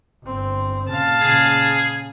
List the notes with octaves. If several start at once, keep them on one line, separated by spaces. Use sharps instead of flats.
G1 C4
A#2 C#3 F5 A5
A#2 C#3 G#4